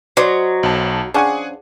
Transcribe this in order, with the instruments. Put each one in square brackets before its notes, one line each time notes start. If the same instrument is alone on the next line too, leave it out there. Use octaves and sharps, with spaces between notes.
[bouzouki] F#3 [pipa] C5 D5 D#5
[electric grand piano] B1 A5
[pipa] F3 C#4 D4 [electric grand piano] G#4 F#5 G#5